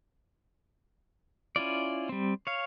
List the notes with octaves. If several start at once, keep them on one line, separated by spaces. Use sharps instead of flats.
C#4 E4 F4 D5
G3 C4
C#5 F5